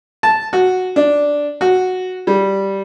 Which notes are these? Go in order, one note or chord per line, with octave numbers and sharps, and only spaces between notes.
A5
F#4
D4
F#4
G3